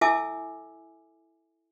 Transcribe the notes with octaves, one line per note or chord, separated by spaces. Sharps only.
E4 A4 E5 G#5 D6 E6